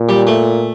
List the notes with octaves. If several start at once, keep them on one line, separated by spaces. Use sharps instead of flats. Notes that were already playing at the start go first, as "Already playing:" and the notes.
Already playing: A#2
G3
A3